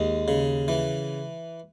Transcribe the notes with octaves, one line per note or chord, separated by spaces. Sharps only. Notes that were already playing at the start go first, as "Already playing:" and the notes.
Already playing: D#2 G#3
C#3
E3